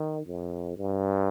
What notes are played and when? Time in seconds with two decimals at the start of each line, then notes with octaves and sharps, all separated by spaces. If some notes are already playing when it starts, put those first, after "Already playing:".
Already playing: D#3
0.26 F2
0.77 G2